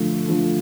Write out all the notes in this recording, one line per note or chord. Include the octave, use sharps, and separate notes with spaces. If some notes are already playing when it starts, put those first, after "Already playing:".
Already playing: D3 F3 A3
D3 F3 A3